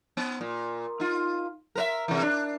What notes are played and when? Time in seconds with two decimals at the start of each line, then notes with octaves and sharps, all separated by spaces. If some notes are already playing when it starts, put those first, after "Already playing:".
0.17 B3
0.41 A#2
1.00 D#4 F4
1.75 A#4 B4 E5
2.08 C3 E3
2.23 D4